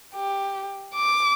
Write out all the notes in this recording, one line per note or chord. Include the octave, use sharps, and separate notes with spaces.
G4
D6